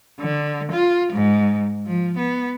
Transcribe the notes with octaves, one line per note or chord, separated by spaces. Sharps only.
D3
F4
G#2
F3
B3